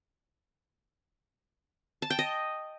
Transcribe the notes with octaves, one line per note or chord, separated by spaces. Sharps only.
A5
G5
D#5